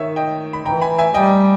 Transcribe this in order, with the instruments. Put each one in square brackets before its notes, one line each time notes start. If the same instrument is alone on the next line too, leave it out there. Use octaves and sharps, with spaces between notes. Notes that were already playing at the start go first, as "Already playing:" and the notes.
Already playing: [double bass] D#3 [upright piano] C#5 E5
[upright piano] D#5 G5
B5
[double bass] E3 [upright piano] G5 A#5
[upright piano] G#5 B5
E5 G#5
[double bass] G3 [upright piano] D#5 G5